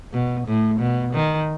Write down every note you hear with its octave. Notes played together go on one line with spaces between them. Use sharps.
B2
A2
B2
D#3